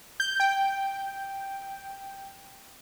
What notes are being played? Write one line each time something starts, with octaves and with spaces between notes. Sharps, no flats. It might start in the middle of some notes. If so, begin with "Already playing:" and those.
G6
G5